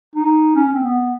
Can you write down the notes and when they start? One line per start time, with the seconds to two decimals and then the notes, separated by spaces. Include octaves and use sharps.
0.15 D#4
0.56 C#4
0.67 C#4
0.74 C4
0.83 B3